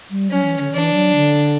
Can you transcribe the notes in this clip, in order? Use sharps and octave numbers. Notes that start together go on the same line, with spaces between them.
G3
F#3 C#4
E3
D3
E3 D4
F#3
D3